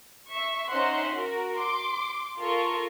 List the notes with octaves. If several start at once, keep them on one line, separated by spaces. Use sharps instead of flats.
E5 C#6
C#4 D#4 C5 E5 F#5 C6
F#4 A#4
C6 D6
F4 A4 A#4 C6 C#6